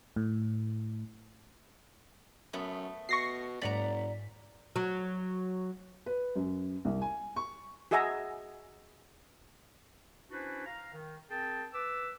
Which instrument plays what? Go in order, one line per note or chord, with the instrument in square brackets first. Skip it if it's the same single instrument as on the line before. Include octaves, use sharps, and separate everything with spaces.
[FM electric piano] A2
[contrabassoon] F#2 [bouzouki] A3 B3
[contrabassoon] B2 [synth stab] C#6 A#6 C7
[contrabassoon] F#1 [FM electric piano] G#2 B6 [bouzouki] D5 F#5 A#5
[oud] F#3
[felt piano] B4
F#2
C2
G#5
C#6
[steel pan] F#4 G#4 D#5 E5 G#5 A#5
[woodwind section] C#4 D4 E4 F#4 B4 C5
F5 A#5
D#3
C4 G#4 A#4 G5 A5
B4 D6 E6